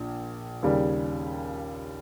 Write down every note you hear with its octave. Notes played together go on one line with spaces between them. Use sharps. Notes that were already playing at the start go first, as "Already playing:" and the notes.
Already playing: A#1
D#2 C#3 G3